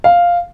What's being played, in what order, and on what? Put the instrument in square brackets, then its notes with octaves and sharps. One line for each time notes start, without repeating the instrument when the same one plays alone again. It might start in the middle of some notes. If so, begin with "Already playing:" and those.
[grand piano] F5